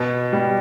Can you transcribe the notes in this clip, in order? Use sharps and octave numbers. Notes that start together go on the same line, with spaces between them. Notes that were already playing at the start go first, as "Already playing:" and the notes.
Already playing: B2
G3